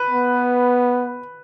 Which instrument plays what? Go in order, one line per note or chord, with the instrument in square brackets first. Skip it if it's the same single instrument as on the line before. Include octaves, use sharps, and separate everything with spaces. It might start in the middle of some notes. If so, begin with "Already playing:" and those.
Already playing: [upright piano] B4
[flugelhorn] B3